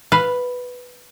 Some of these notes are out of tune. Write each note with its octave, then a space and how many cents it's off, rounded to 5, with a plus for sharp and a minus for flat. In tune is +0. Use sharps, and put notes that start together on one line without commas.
B4 +0 F5 +0